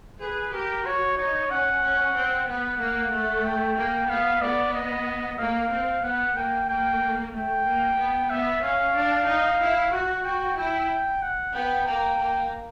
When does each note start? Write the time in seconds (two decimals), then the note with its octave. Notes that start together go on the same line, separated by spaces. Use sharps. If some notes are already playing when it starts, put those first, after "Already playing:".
0.21 G#4 B4
0.54 G4 A#4
0.85 F#4 C#5
1.18 D#4 C#5
1.50 C#4 F#5
1.83 C#4
2.15 C4
2.48 B3 F#5
2.80 A#3
3.13 A3
3.45 G5
3.78 A#3
4.10 B3 F5
4.42 B3 D5
4.74 D#5
5.39 A#3 F5
5.72 C4
6.04 B3 F#5
6.36 A#3 G5
6.68 A#3 G5
7.34 A3 G5
7.66 A#3
7.98 B3
8.30 B3 E5
8.63 C#4 F5
8.96 D4
9.28 D#4
9.61 E4
9.93 F#4 F#5
10.25 F#4 G5
10.57 E4 G5
11.22 F#5
11.55 B3 G5
11.87 A#3 G5
12.19 A#3